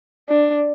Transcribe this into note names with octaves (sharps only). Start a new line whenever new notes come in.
D4